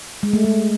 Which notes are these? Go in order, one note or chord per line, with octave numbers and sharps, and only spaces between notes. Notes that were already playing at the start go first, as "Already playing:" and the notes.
G#3
A3
G#3